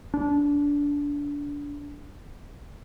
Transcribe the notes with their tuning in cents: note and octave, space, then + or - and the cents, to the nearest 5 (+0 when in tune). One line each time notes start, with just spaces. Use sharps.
D4 -25